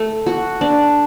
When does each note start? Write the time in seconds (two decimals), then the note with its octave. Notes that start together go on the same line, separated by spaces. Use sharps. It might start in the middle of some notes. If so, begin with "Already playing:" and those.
Already playing: A3
0.26 F#4
0.61 D4